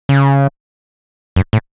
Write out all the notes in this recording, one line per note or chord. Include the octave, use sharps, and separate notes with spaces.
C#3
F#2
A2